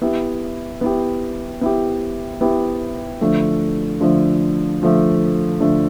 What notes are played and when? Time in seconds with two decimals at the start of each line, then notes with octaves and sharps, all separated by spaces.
0.02 B3 E4 G4
0.81 B3 E4 G4
1.61 B3 E4 G4
2.41 B3 E4 G4
3.21 D3 F3 A3
4.01 D3 F3 A3
4.80 D3 F3 A3
5.60 D3 F3 A3